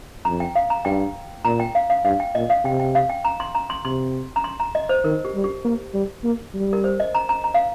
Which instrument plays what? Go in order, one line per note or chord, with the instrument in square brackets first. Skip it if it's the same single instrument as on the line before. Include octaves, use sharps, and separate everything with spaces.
[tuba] F2 [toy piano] A#5
[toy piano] G5
F5
A#5
[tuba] G2 [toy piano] G5
[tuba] A#2 [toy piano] A#5
[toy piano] G5
F5
F5
[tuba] G2 [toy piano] F5
[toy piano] G5
[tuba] A#2 [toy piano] D#5
[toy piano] F5
[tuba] C3 [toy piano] G5
[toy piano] G5
F5
G5
A#5
C6
A#5
C6
[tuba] C3 [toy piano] C6
[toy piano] A#5
C6
A#5
D#5
C5
[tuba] D#3 [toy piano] A#4
[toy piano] G4
[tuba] G3
[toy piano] G4
[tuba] A#3
G3
A#3
G3
[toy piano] A#4
C5
D#5
A#5
A#5
A#5
F5